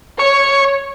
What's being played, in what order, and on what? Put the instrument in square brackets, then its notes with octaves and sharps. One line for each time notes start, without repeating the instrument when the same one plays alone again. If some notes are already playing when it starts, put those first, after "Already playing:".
[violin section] C#5 [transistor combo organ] C#6